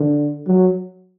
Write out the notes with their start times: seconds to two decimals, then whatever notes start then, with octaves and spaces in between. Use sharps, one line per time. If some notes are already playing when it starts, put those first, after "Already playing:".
Already playing: D3
0.47 F#3